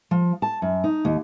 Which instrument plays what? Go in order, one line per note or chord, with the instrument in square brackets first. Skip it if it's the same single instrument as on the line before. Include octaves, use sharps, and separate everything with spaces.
[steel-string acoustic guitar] F3
A5
F#2
D#4
D#2